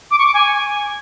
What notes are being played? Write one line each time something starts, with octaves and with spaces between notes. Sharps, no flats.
D6
C#6
D6
G#5